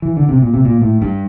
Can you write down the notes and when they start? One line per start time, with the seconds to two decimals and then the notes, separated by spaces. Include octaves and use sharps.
0.02 E3
0.17 D3
0.29 C3
0.42 A#2
0.54 C3
0.65 A#2
0.82 A2
1.02 G2